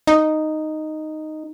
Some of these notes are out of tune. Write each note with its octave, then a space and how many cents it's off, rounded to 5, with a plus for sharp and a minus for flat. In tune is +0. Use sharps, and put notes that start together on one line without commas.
D#4 -5